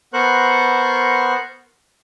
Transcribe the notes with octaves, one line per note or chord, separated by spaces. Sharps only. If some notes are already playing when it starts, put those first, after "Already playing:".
B3 A#4 C5 C#6 F#6